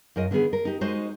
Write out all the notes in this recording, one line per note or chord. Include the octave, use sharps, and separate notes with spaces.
F#2 F4 A#4 D#5
D3 D#3 B3 G#4 B4
A#4
D#4 G4
G#3 D#4 F#4 C5 D#5